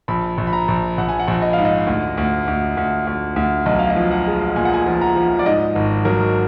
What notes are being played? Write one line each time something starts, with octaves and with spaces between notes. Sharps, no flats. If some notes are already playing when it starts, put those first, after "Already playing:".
A#1 B5
A#1
B5
A#5
A#1
A#1 F#5
G#5
F#5
A#1
D#5
G#2 F5
D#5
D2
D2
D2
D2
D2
D2
B1 D#5
F5
D#5
F3
F#5
G#3
A#2 G#5
F#5
G#5
F3
A#5
F3
D5
G#2 D#5
G#1
F#3 A#4